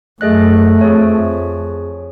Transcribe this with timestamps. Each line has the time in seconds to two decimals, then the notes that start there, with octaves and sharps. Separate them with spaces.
0.21 F#2 A3 G#4 D#5 F#6
0.81 F2 G#4 C#5